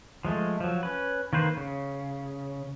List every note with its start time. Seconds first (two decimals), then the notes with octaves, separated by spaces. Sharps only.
0.25 F3 G#3 A3
0.60 F3 F#3
0.83 C#4 B4
1.33 D#3 A#3 B4 C5
1.57 C#3